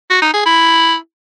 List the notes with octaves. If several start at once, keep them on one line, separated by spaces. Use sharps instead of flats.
F#4
D#4
G#4
E4